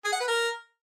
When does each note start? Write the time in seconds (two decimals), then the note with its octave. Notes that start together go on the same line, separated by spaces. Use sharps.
0.05 G#4
0.12 F#5
0.20 B4
0.28 A#4